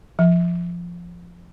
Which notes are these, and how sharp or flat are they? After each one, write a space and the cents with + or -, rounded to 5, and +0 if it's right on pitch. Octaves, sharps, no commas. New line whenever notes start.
F3 -10